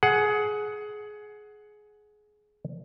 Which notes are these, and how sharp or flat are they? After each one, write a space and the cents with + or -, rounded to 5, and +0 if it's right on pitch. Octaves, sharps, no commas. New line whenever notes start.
G#4 +20 F#5 +0